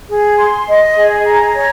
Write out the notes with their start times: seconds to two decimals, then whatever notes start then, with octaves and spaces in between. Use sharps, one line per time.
0.09 G#4
0.39 C6
0.68 D#5
0.96 G#4
1.26 A#5
1.55 C#5